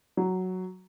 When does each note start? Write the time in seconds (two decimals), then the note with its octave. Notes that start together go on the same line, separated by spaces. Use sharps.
0.17 F#3